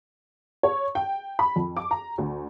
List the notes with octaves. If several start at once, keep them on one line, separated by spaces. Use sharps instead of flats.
C#5
G5
B5
F2
D6
A#5
D2